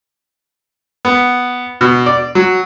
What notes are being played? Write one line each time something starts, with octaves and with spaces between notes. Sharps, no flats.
B3
B2
D5
F#3